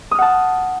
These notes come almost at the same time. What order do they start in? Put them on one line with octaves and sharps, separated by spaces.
D#6 F6 F#5 A5